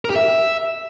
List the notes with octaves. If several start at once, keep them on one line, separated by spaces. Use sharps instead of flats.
A#4
G4
E5